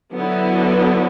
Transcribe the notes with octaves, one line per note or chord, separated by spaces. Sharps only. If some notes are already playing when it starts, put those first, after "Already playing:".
D3 F#3 B3 E4